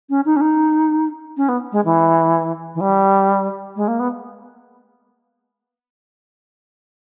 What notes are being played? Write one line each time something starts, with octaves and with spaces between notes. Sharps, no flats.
C#4
D#4
C#4
D#4
C#4
B3
G#3
E3
E3
G3
G#3
A#3
B3